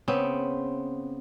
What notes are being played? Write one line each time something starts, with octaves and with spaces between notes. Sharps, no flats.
C#3 B3 C4